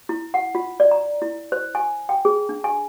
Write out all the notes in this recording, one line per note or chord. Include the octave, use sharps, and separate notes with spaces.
E4
F#5
F4
D5
A#5
E4
C5
G#5
G5
G#4
D4
G#5